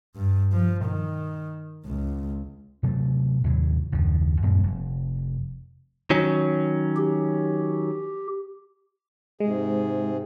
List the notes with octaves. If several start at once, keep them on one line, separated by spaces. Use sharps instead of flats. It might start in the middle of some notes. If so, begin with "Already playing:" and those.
G2
F3
D#3
C#2
C3 F#3 G3 A3
D#2 A2 C3 F#3
F#1 D#2 C#3 F3
F#2 A#2 G3 C4
F1
D#3 F#3 C#4
G4
G#2 C3 G#3 G#4